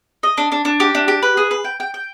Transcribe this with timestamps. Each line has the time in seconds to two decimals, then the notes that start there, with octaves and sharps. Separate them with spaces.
0.23 D#5
0.38 D4
0.52 D4
0.65 D4
0.80 G4
0.95 D4
1.08 G4
1.23 B4
1.37 G#4
1.51 B4
1.65 G5
1.80 G5
1.94 G5